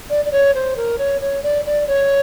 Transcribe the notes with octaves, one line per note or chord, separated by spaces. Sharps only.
D5
D5
C#5
C5
A#4
C#5
C#5
D5
D5
C#5